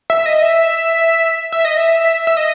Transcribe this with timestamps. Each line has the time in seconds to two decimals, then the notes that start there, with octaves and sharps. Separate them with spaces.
0.10 E5
0.26 D#5
0.42 E5
1.52 E5
1.65 D#5
1.77 E5
2.27 E5
2.37 D#5